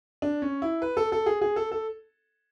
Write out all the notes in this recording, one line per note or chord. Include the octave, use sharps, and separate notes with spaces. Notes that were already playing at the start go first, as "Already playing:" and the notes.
D4
C#4
E4
B4
A4
A4
G#4
G#4
A4
A4